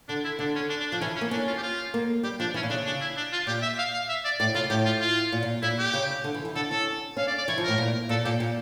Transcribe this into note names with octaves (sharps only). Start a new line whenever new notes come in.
D3 D4
E4
D3 D4
C#4
D4
D4
F3 D4
E3 C#4
C#4
A#3
C#4 D4
F4
G4
F4
A#3
G3 G4
F3 D4
E3 C#4
A#2
C#3 D4
D4
E4
D4
F4
A#2 G4
E5
F5
F5
E5
D5
A2 D5
C#3 F4
A2 G4
F4
F4
A#2
A#2
A#2 E4
G4
C#3
D3
E3
E3
D3 A4
C#4 A4
C#4 F5
D5
D5
E3 C#5
F3
A2 A#4
A#2
A#2 A4
A#2 G4
A#2